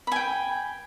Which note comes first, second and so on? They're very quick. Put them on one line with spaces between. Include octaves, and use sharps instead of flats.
B5 G#5 G5